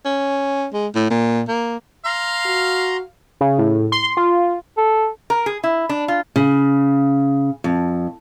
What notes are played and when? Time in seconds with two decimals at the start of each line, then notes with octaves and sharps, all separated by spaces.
0.05 C#4
0.73 G#3
0.95 A2
1.10 A#2
1.48 A#3
2.05 F5 A#5 C6
2.45 F#4
3.41 C#3
3.59 A2
3.92 C6
4.17 F4
4.77 A4
5.30 A#4
5.46 G#4
5.64 E4
5.89 D4
6.08 F4
6.36 C#3
7.64 F2